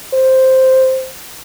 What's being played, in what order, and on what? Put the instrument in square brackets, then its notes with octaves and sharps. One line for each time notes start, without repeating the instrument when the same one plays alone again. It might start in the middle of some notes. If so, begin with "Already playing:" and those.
[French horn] C5